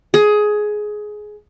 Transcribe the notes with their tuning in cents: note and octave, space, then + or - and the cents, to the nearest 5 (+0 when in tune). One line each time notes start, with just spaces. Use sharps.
G#4 +15